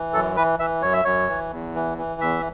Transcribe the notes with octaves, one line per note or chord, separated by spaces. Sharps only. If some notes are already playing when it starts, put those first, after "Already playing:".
Already playing: E3
F#2 A4
E3 B4
E3 E5
F#2 C#5
E5
F#2 C#5
E3
E2
E3
E3
E2 E5